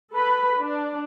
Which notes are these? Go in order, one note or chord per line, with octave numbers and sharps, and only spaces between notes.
A4 B4 B5
D4